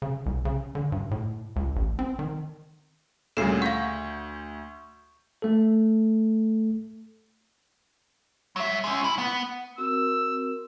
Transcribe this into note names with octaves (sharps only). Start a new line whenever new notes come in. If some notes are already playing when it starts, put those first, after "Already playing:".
C#3
C2
C#3
D3
G2
A2
C#2
A1
C4
D#3
D2 A#2 C#3 G3 A4 C7
F5 F#5 C#6 G6
A3 A4
F#3 E5
G#3 C#4
E4
B3
C4 F#4 A#4 E6